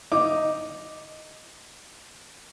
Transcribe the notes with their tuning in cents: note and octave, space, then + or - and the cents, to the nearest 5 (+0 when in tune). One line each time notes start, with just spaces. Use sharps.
D#4 +0 D6 +0